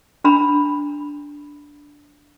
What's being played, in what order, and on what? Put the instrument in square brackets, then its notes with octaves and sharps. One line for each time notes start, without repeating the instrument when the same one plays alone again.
[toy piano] D4 A#5 B5